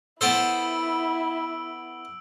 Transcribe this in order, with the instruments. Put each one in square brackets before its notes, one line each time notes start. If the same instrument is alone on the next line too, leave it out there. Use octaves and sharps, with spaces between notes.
[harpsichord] B3 A4 C5 [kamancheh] E4 [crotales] E6 D7 F#7